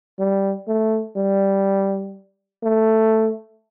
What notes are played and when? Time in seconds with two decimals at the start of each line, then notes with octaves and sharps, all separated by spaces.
0.19 G3
0.68 A3
1.17 G3
2.63 A3